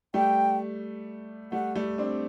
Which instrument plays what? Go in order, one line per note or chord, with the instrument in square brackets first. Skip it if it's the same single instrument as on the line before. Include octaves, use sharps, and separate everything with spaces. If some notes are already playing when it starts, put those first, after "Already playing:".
[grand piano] G3 A3 [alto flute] G5
[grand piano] G3 A3 [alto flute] F#5
[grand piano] G3 A3
C4 D4